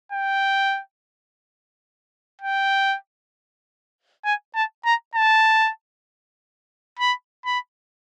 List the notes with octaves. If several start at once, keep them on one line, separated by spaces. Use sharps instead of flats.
G5
G5
G#5
A5
A#5
A5
B5
B5